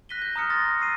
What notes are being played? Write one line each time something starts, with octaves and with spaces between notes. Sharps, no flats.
F#6 A#6 B6 D#7 G7
F#6 G6 A#6
A#5 D#6 F6 C#7
C6 D#6 A6 A#6
C#6 E6 C7 D#7